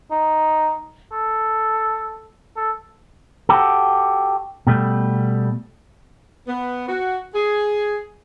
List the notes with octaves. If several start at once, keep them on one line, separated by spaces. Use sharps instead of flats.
D#4
A4
A4
F#4 G4 A4
B2 G3 A3
B3
F#4
G#4